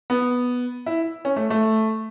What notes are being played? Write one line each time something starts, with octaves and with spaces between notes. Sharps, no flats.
B3
E4
C#4
A3
A3